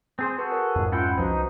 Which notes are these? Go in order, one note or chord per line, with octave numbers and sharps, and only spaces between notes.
C4 G#4 C5
F#4 G#4 A4 B4
A#4 C#5
F2 G#2
C#4 E4 F4 F#5 G5 C6
C2 F3 D#4 F#4 B4 C5